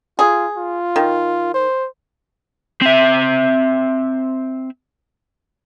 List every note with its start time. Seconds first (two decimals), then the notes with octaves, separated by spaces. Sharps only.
0.19 F4 G#4
0.57 F4
0.96 D#3
1.54 C5
2.81 C4 E5